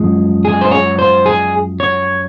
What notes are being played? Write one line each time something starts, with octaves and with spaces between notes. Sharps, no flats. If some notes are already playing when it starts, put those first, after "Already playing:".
Already playing: F#2 F3 G#3
G#4
C5
C#5
C5
G#4
C#5